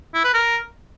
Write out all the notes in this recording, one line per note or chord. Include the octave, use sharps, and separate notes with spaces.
E4
B4
A#4